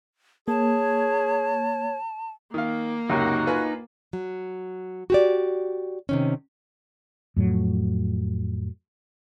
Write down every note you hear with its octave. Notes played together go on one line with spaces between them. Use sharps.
A#3 G#4 C#5 A5
D#3 A#3 F5
C#2 F#2 C3 D#4 F#4
F4 B4 G#5
F#3
F#4 G4 D5
C3 D#3 C#4
F2 A2 F#3